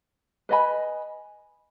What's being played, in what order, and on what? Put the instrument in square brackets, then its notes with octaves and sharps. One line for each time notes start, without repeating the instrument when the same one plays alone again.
[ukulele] B4 D#5 G#5 B5